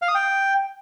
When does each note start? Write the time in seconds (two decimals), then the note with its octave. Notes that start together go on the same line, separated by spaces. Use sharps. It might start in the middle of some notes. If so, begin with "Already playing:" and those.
0.02 F5
0.08 D#6
0.15 G5